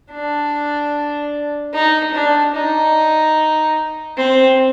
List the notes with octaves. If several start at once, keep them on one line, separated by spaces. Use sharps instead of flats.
D4
D#4
D4
D#4
C4